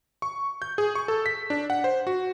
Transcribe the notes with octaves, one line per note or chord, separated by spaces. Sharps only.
C#6
G6
G#4
C#6
A4
B6
D4
F#5
C5
F#4